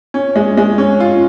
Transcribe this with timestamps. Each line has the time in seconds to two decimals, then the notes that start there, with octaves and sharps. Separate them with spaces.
0.14 C#4
0.36 G#3
0.57 G#3
0.78 C#4
1.00 F4